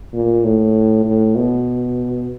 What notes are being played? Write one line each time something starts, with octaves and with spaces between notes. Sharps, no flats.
A#2
A2
A2
B2